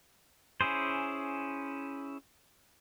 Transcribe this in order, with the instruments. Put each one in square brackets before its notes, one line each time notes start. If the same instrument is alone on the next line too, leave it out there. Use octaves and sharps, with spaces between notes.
[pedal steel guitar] C#4 E4 G#4 C5